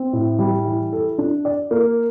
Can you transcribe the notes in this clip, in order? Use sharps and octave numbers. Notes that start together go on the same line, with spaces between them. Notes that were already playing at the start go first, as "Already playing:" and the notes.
Already playing: C4
A2
G3
E3
A4
D4
D5
A#3